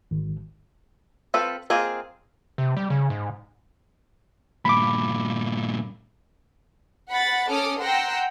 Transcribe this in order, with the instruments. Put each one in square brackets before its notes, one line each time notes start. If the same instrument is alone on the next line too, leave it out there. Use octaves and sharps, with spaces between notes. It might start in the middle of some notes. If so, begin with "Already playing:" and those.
[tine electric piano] G#1
[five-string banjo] C4 F4 A4 B4
A#3 C4 F4 G#4 D#5
[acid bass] C3
G3
C#3
G#2
[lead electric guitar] G2 A#2 [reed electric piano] B5 D6
[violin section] F#5 B5 A6
C#4 A4 D6 D#6 F6 D7
F#5 G5 A#5 C6 E6 A#6